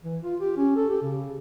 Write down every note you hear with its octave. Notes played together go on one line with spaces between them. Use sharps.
E3
F4
G4
C#4
A4
G4
C#3